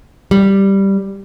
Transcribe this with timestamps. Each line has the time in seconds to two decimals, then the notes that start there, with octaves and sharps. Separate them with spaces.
0.31 G3